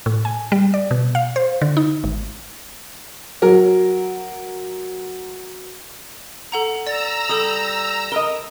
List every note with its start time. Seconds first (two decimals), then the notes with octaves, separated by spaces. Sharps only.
0.06 A2
0.25 G#5
0.52 G3
0.74 D5
0.91 B2
1.15 F5
1.36 C5
1.62 D3
1.77 D#4
2.04 G#1
3.42 F#3 A#4
6.52 A4 F#5 A#5
6.87 D5 A#5 E6 A6
7.29 G3 A4 D#6
8.12 A#4 D#5 G7